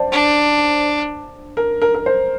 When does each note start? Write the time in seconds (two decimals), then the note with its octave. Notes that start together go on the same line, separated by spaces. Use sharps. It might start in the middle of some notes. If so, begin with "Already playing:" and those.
Already playing: C5 D5 F#5 A5
0.12 D4
1.57 A#4
1.82 A#4
1.94 A#4
2.06 C5